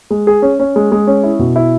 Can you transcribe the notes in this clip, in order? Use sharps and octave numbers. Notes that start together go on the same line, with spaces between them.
G#3
G#4
C#4
C#4
G#3
G#3
C#4
E4
B2
E4